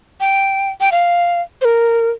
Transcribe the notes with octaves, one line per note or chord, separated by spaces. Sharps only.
G5
G5
F5
C5
A#4